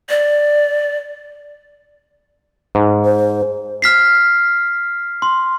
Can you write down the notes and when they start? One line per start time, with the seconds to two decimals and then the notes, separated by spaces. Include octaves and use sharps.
0.09 D5
2.75 G#2
3.05 C5
3.82 F6 B6 C7
5.22 C6